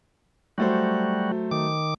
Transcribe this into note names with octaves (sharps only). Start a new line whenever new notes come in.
F#3 G3 A3 F#4 C5
D#3 D6